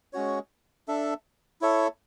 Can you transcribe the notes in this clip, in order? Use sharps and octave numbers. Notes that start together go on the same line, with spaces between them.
G#3 C#4 F#4 C#5
D4 A4 E5
E4 A4 C#5 E5